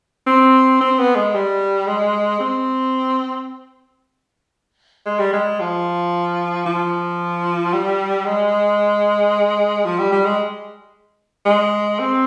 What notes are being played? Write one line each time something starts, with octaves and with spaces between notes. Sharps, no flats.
C4
C4
B3
G#3
G3
G#3
C4
G#3
G3
G#3
F3
F3
G3
G#3
F3
G3
G3
G#3
G#3
C4